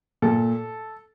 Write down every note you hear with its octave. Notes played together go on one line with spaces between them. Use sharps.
A#2 A4